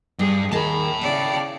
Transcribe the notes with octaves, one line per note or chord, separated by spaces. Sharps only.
G2 G3 G#4
D#2 D#3 G#4 A#4 A5 B5
C#3 E4 D5